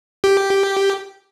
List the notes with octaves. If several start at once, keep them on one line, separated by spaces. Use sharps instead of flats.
G4